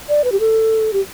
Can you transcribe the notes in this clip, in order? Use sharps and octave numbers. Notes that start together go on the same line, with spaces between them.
D5
B4
G4
A4
G4